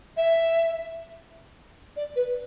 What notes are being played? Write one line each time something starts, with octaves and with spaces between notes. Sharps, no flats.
E5
D5
B4